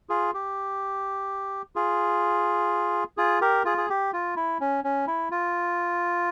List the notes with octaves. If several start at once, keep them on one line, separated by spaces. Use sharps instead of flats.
F4 G#4
G4
F4 G#4
F4 G#4
G4 A#4
F4 G#4
G#4
G4
F4
E4
C#4
C#4
E4
F4